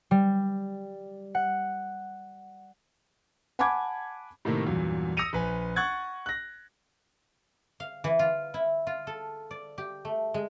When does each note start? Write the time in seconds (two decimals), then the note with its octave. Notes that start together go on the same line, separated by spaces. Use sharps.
0.11 G3
1.35 F#5
3.59 F#5 G#5 A5 B5 D6 G#6
4.45 A2 C3 D#3 A3 A#3
4.66 E2 G2 A#2 F#3
5.17 D#6 E6 A#6 C#7 D#7 F7
5.33 A#1 B4 G#5
5.76 F#5 C#6 F#6 G#6 A6
6.26 F#6 A#6
7.80 F5
8.04 E3
8.19 F4
8.54 E4
8.87 F4
9.07 A4
9.51 D5
9.78 G4
10.05 A3
10.34 G#3